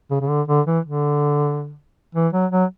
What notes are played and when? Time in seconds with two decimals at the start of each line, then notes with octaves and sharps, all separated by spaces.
0.10 C#3
0.21 C#3
0.29 D3
0.48 D3
0.66 E3
0.85 D3
2.15 E3
2.33 F#3
2.52 F#3